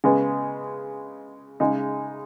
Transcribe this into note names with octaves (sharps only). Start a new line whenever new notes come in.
C#3 G#3 B3
C#3 G#3 D#4